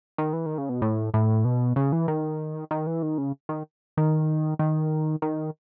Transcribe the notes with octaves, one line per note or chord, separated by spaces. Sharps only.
D#3
E3
D#3
C#3
B2
A2
A2
B2
C#3
E3
D#3
D#3
E3
D#3
C#3
D#3
D#3
D#3
D#3